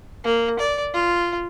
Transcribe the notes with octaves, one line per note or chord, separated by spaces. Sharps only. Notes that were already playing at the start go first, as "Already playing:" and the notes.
A#3
D5
F4